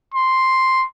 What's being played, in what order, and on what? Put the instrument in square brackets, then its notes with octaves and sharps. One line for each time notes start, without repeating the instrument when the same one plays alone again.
[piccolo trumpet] C6